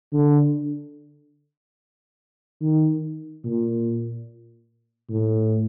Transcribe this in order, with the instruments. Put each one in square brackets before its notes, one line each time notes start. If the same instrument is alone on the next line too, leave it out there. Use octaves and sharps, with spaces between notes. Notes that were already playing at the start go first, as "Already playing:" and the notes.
[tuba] D3
D#3
A#2
A2